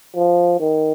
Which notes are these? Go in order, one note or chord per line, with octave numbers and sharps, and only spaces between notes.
F3
D#3